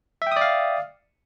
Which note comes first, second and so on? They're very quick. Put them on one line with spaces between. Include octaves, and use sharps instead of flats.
E5 G5 D#6 D5 F5